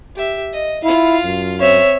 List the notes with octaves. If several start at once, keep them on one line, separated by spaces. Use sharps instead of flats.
G4 E5
D#5
E4 F4 F5
F#2
C4 C#5 E5